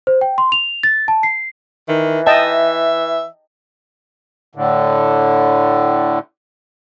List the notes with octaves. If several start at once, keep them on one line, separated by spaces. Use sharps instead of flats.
C5
G5
C6
F7
A6
A5
C7
D#3 E3
D#5 E5 G5 A5
A2 D3